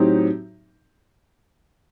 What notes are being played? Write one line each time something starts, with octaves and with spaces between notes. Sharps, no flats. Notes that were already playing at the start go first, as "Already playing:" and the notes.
Already playing: A2 F#3 C4 D#4 G4